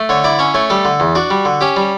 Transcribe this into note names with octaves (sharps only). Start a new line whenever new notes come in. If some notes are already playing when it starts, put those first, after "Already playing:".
Already playing: A3
D3 C#5
E4 D5
C#4 C#5
A3 C#5
G3 A4
D3
E2
D4 F#4
G3
D3
C#4 G4
G3